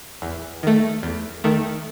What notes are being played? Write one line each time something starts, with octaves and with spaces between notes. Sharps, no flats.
E2
D#3 A3
E2
D#3 A3